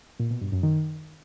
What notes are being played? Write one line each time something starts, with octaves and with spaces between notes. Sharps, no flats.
A#2
B2
G2
F#2
D#3